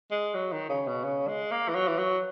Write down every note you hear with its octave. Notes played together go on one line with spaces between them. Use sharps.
G#3
F#3
D#3
C#3
B2
C#3
G#3
A#3
E3
F#3
E3
F#3